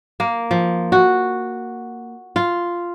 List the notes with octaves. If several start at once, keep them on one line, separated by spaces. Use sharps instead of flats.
A#3
F3
F#4
F4